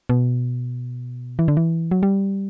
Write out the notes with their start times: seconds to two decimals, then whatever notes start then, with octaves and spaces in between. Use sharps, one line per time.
0.09 B2
1.39 E3
1.48 D3
1.57 E3
1.91 F#3
2.03 G3